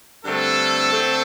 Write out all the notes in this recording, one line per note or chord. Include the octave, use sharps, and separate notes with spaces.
G2 D3 A3 C4 A4
D3 A3 C4